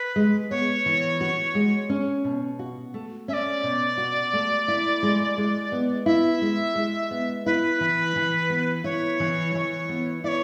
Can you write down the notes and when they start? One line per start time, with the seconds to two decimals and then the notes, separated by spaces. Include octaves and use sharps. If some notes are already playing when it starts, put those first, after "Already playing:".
Already playing: B4
0.16 G#3
0.50 B3 C#5
0.86 E3
1.21 F#4
1.55 G#3
1.90 C#4
2.24 B2
2.59 F#4
2.94 A3
3.28 C#4 E5
3.34 D5
3.63 B2
3.98 F#4
4.33 A3
4.68 E4
5.03 G#3
5.38 G#3
5.72 B3
6.06 E4 E5
6.41 G#3
6.76 G#3
7.11 B3
7.46 E4 B4
7.81 E3
8.16 E3
8.50 B3
8.84 E4 C#5
9.20 E3
9.55 E3
9.89 B3
10.24 E4 C#5 D5